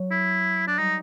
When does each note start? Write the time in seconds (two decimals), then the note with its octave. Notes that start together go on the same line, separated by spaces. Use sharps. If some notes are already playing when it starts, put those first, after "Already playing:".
Already playing: F#3
0.11 E4
0.67 D4
0.78 G3 D#4